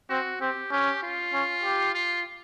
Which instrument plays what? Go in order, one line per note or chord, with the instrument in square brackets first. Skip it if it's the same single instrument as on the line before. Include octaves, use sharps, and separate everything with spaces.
[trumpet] C4 [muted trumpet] F#4
[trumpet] C4 [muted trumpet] G4
[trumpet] C#4 [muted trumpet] G4
[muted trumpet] F4
[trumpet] C#4
G4
[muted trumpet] F4